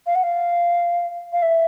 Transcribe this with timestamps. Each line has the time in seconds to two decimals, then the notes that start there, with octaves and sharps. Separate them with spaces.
0.06 F5
0.15 F#5
0.23 F5
1.33 F5
1.42 E5